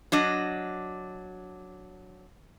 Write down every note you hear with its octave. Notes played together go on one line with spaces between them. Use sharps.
F#3 D4 D#5